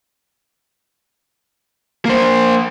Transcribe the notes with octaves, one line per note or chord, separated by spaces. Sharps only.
A#3 C5